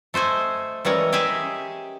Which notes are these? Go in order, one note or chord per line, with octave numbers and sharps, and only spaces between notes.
A3 C5 D#5 G#5
E3 G3 G#3 C#4 A#4
G4 G#4 D#5 E5 G#5